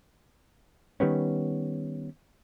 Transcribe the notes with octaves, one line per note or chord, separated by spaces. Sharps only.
D#3 G3 B3 C#4